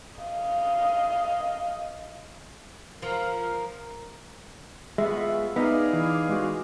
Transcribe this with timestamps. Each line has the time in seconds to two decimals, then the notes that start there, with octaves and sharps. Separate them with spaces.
0.20 D#5 F5
3.02 F3 A#4
4.98 G#3 B3 F4 F#4 E5
5.56 B3 D#4 G#4 D5 F5
5.93 E3
6.29 G#3 F#4